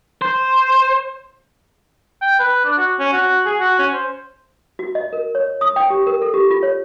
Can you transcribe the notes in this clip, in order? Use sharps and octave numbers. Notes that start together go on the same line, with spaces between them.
C5
G5
B4
D4
F#4
C#4
F#4
G#4
F#4
C#4
C5
F#4
D#5
A#4
C#5
D#6
G5
G4
A#4
A4
G4
F4
C#5